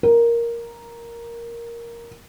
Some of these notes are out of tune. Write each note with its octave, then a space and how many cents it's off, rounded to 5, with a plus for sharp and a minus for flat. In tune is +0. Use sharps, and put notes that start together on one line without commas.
A#4 +5